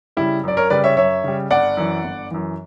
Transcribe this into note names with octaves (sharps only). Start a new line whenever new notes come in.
C#3 G3 E4
F#2 D5
A#4 C#5
C#3 G3 B4 D5
C#5 E5
F#2 C#5 E5
C#3 G3
G1 D5 F#5
F#2 E3
G1
F#2 E3